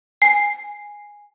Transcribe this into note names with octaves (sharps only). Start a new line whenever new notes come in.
G#5 C7